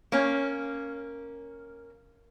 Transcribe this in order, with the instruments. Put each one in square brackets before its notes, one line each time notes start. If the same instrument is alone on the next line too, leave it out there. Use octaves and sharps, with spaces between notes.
[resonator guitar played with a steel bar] A#3 C#4